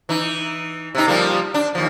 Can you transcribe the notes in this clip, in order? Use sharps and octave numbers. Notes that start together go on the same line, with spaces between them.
E3 D#4
C3 D#4
F3 G3 A#3
D4
D#2 F3